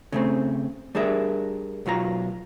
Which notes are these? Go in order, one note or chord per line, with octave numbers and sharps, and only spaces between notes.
C#3 A3 C4
G3 D4 G#4 A#4 E5
B1 F#3 F4 A#5